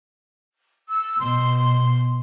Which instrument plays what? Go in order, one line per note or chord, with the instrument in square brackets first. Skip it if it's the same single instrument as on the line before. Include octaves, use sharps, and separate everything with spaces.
[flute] E6
[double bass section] B2 [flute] C6